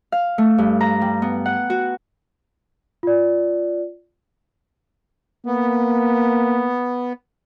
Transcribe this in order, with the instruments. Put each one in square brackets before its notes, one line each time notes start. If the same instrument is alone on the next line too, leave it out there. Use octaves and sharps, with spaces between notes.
[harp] F5
A3
G2
A#5
G3
B3
F#5
F#4
[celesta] F4 D5
[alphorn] A#3 [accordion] B3